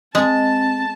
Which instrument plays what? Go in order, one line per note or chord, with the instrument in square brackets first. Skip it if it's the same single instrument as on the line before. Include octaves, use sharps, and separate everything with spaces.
[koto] G#3 [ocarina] C4 [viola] A5